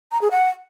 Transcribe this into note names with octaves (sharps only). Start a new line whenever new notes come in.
A#5
G#4
F#5